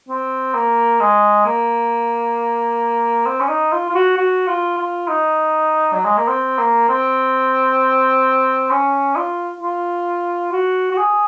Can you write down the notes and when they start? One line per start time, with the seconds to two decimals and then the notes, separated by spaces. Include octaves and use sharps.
0.09 C4
0.55 A#3
1.00 G#3
1.46 A#3
3.27 C4
3.40 C#4
3.49 D#4
3.73 F4
3.90 F4
3.95 F#4
4.18 F#4
4.48 F4
4.78 F4
5.08 D#4
5.93 F#3
6.05 G#3
6.17 A#3
6.28 C4
6.59 A#3
6.89 C4
8.71 C#4
9.16 F4
9.61 F4
10.52 F#4
10.92 F#4
10.98 G#4